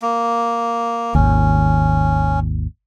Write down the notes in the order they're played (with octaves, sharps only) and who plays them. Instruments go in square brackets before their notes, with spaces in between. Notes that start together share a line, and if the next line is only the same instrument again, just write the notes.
[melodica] A#3
[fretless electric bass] G#1 D#2 [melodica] C#4